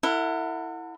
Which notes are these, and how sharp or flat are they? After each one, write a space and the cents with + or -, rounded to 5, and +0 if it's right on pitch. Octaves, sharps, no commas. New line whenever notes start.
E4 +0 A4 +45 F#5 -20